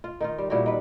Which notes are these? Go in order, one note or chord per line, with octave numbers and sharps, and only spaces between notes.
F4
D#3 D#4 F4
G3
A#2 G3 E4 F#4
D#3 B4